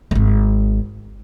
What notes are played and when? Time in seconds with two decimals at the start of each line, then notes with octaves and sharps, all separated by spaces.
0.11 D#1 G#1